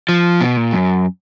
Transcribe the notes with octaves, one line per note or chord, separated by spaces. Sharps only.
F3
B2
A#2
F#2